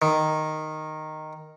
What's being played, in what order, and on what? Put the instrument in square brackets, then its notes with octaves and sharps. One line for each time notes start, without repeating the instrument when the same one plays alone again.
[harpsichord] D#3